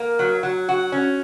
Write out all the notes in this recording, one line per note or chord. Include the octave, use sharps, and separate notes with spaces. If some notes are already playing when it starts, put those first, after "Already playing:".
Already playing: A#3
F#3
F#3
F#4
C#4